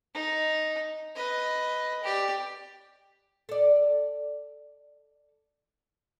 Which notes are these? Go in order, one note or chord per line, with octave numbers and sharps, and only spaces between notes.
D#4
B4 D#5
G4 D5
A4 D5